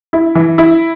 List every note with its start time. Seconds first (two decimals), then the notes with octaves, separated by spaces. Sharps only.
0.13 E4
0.35 E3
0.58 E4